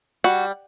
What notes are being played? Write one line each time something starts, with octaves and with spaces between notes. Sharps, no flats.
G3 F#4